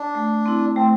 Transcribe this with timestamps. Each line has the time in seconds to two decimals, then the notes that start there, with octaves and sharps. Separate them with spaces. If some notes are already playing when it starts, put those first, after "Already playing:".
Already playing: D4
0.15 A3
0.46 C4 E4
0.76 A3 C4